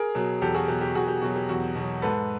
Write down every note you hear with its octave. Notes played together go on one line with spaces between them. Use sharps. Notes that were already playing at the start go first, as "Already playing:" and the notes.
Already playing: G#4 A#4
B2 F#3
E2 G4 A4
F#4 G#4
B2 F#3 G4
G4
E2 F#4 G#4
G4
B2 F#3 F#4
G4
E2 F#4
B2 F#3
G#2 A4 B4